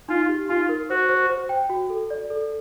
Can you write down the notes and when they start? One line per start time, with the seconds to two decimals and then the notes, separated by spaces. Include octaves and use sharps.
0.09 D#4 F4
0.29 G4
0.49 D#4 F4
0.69 A#4
0.89 F#4 C5
1.09 C5
1.30 C5
1.49 G5
1.70 F#4
1.90 A4
2.10 D5
2.30 A4